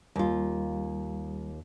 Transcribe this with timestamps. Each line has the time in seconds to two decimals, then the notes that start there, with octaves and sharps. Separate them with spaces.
0.16 D#2 G3 F4